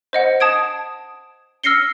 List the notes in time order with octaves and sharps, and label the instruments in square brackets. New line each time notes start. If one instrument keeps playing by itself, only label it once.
[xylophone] C5 D#5 F#5
A5 D#6 G#6 D7
E6 F6 A#6 C7 C#7 G7